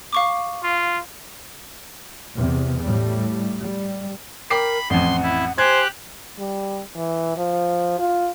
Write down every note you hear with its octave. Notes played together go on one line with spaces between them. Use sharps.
F5 C#6 D6
F4
E2 C3
A2 G3
G3
A#4 G5 B5 D6 C7
A1 F2 F#5 C6
E4
G4 C5 G#5 F#6 G#6
G3
E3
F3
F4